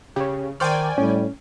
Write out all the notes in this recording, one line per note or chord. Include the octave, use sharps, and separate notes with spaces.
C#3 G4 C#5
D#3 C5 D5 G5 G#5 C#6 F6
A2 G3 C#4